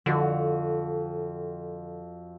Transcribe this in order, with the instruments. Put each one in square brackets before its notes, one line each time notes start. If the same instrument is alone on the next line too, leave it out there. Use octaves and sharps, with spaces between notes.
[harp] F2 F#4 [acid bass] D3